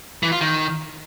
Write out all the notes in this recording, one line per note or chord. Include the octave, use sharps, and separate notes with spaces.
E3
F4
D#3